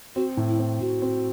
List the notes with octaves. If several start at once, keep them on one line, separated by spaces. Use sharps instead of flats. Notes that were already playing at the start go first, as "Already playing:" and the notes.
C4 F#4
A2
E4
C4
A2 F#4
C4